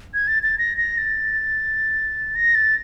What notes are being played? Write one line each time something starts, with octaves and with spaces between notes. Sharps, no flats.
G#6
A6
A6
A#6
A#6
A6
A#6
A6